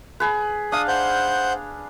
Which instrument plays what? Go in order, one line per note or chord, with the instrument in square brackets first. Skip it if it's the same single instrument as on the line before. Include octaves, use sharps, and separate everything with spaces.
[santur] G#4 B4
[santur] D4 F5 [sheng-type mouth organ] D#6
[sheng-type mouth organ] C5 F#5 G6